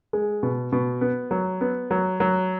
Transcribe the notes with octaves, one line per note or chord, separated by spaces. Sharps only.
G#3
B2
B2
B3
F#3
B3
F#3
F#3